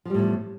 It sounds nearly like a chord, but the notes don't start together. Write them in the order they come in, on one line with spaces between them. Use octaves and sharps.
F3 G3 A2 E2